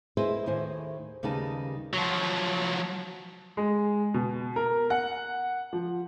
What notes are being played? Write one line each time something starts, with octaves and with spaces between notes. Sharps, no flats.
E4 G#4 B4 C5 D#5 E5
D#2 A2 D#3 E4 C5 G#5
D#2 C#3 G3 D#4 B4 A5
F3 F#3
G#3
B2
A#4
F#5
F3